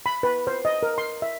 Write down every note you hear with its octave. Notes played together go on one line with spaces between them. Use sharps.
B5
B4
C5
D#5
A#4
C6
E5